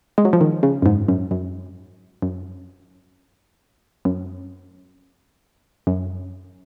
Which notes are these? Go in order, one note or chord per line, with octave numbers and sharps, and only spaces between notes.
G#3
F#3
F3
D#3
C#3
F#2
G#2
F#2
F#2
F#2
F#2
F#2